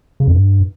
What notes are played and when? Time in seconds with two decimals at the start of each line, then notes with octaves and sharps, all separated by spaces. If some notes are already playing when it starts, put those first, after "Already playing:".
0.20 C#3
0.27 F2
0.34 G2